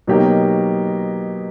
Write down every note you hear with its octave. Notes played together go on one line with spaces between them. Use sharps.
B2 F#3 A#3 D#4 G4